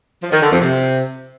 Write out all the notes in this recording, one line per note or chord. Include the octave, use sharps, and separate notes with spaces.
F3
D#3
D3
F2
C3